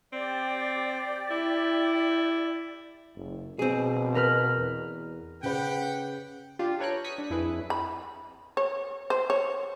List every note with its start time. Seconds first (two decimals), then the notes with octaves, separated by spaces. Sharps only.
0.13 C4 G4 D5
1.30 E4
3.16 F#1
3.59 B2 C4 G#4
4.15 A#4 B4 F6
4.57 E2
5.43 C#3 G4 B4 F#5 G5
6.59 D4 F4 G4
6.80 A4 B4 C#5 G5 A#5 F#6
7.04 D#6 G#6 B6 C#7
7.18 D4
7.30 F2 E4 G#4 B4
7.70 B5
8.57 C#5
9.10 C5
9.30 C#5